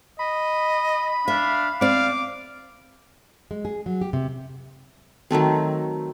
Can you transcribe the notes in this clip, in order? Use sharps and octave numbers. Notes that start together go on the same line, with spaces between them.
D#5 B5
D4 E5 F5
C4 D5 F5 D6
G#3
G#4
F#3
G4
C3
D#3 F#3 A3 C4